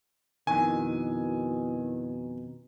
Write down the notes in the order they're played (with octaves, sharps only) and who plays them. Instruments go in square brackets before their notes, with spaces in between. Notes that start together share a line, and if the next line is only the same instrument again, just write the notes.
[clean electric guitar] F2 D#3 [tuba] B2 [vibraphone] E4 F#4 A#4 [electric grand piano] G#5